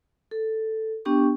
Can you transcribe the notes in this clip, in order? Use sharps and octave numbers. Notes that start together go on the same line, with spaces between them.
A4
B3 D4 G4 G5 C#6